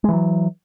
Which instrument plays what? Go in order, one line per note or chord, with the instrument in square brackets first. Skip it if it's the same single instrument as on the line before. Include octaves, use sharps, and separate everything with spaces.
[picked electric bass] G#3
E3
F#3